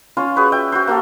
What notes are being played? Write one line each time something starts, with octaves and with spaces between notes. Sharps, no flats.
C#4 F4 C6
F#4 G#4 B4 C#5
E5 G5
F#4 C5
A#3 F#4 A4